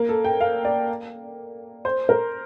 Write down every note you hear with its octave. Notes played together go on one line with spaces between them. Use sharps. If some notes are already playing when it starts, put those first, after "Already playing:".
Already playing: A#3
A4
G5
F5
D5
C5
A#4